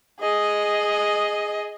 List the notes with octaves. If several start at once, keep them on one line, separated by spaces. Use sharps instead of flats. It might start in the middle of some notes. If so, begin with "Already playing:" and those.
G#4 D#5